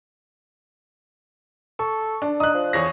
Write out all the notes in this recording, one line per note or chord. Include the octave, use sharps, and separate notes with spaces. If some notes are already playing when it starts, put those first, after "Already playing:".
A4 C#6
D4
D#4 D#6 F#6
F3
E2 C#5 A#6